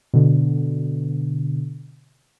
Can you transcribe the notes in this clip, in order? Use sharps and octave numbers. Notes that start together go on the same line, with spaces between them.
B2 D3